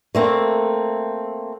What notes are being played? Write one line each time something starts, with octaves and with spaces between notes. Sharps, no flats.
A3 A#3 C4